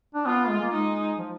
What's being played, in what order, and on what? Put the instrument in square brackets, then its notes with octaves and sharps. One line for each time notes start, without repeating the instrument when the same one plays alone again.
[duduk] D4
[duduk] B3 [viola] F4
[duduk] G#3
A#3
[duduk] G#3 [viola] D#4
[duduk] F3